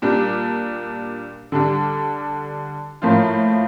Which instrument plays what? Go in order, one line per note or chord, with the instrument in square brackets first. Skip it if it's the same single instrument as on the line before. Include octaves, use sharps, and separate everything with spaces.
[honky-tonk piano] A#2 G3 D4
D3 G3 D4
A2 F3 A#3 F4